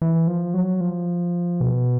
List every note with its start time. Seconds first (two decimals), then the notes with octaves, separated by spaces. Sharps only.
0.02 E3
0.28 F3
0.54 F#3
0.81 F3
1.60 B2